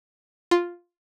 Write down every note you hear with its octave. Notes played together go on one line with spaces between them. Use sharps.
F4